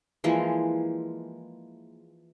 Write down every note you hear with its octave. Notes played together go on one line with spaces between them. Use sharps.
E3 F3 G#3 A#3